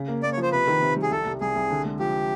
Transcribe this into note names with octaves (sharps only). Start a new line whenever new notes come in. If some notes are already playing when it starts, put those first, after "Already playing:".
Already playing: C#3
A#3
A#3 D5
C#5
F3
C5
C3 B4
D#3
C3
G3
G#4
C2 A4
C2
C2 G#4
C2
D3
G#3
F3 G4